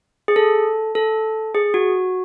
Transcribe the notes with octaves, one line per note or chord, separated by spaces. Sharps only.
G#4
A4
A4
G#4
F#4